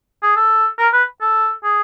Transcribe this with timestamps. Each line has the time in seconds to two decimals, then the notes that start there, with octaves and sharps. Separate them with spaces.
0.23 G#4
0.36 A4
0.79 A#4
0.93 B4
1.21 A4
1.64 G#4